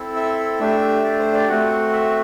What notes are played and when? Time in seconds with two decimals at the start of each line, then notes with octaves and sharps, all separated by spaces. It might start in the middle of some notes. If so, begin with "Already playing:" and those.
Already playing: C4 E4 A4
0.16 E5
0.60 A3 D4 G4 E5
1.04 D5
1.19 C5
1.33 D5
1.49 A3 C4 F#4 F#5
1.93 E5